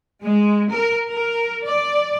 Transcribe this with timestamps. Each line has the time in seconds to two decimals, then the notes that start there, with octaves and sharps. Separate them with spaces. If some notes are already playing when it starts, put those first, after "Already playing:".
0.23 G#3
0.70 A#4
1.09 A#4
1.64 D5